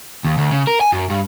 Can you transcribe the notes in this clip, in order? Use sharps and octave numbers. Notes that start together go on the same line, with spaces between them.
D#2
D2
C#3
A#4
G#5
F#2
G2